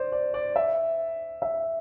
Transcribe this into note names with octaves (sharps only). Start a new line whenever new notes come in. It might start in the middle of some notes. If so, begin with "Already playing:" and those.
Already playing: C5 D5
D5
D5
E5
E5